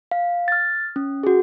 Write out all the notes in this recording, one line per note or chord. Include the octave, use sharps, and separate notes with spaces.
F5
F6 A6
C#4
F#4 G#4